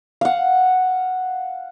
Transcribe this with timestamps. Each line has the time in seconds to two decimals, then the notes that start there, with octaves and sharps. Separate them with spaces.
0.21 F5 F#5